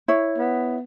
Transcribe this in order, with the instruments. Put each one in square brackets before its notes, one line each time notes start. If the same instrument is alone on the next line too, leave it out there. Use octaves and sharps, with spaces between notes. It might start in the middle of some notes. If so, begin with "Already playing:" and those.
[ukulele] E4 C#5
[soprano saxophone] B3